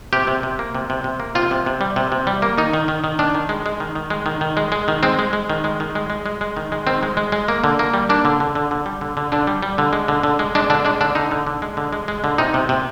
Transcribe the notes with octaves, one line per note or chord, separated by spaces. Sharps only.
C3 G4
C3
C3
A#3
C3
C3
C3
A#3
C3 F4
C3
C3
G3
C3
C3
G3
A#3
D#3 D#4
D#3
D#3
D#3
D#3 D4
D#3
G#3
G#3
D#3
D#3
G#3
D#3
D#3
G#3
G#3
D#3
G#3 C4
G#3
G#3
D#3
G#3
D#3
G#3
G#3
G#3
G#3
D#3
G#3
D#3 C4
G#3
G#3
G#3
A#3
D3
A#3
G3
A#3 D4
D3
D3
D3
D3
G3
D3
D3
D3 D4
G3
G3
D3
G#3
D3
D3
G#3
G#3 D4
D3 D4
G#3 D4
D3 D4
D3 D#4
D3
D3
G#3
D3
G#3
G#3
D3
C3 D#4
C3
C3